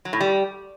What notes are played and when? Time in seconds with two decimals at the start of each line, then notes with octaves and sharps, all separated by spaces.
0.05 F#3
0.13 A2
0.20 G3